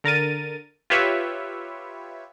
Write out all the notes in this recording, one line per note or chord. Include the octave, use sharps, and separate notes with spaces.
D3 A#4 A6 D#7
F4 G4 B4 C#5 E5